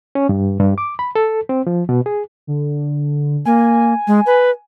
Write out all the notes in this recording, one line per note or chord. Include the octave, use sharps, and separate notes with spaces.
C#4
G2
G2
D6
B5
A4
C4
F3
B2
G#4
D3
A#3 G#5
G#3
B4